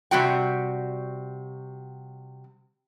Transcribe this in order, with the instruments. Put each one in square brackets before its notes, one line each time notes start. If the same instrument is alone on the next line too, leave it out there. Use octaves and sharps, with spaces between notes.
[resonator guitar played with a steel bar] C3 G3 F#4 G5